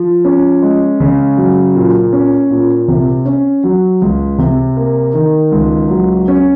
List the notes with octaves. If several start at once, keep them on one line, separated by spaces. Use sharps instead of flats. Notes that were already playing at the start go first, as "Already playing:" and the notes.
Already playing: F3
C#4
G#3
C#3
F#3
A#2
C#4
A#2
C3
C#4
F#3
C#2
C3
A#3
D#3
C#2
F#3
C#4